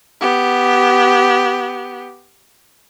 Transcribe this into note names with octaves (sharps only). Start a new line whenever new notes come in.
B3 G4